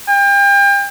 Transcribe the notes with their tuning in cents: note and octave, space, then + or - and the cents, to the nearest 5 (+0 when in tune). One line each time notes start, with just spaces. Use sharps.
G5 +35